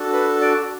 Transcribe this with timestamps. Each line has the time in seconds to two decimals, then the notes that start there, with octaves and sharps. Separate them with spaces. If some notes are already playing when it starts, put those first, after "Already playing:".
Already playing: D4 F#4 A4
0.13 B4
0.41 D5